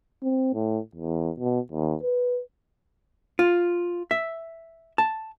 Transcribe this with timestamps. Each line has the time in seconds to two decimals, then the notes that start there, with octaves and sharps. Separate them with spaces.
0.23 C4
0.54 A2
0.95 E2
1.40 B2
1.72 D#2
2.03 B4
3.39 F4
4.11 E5
4.98 A5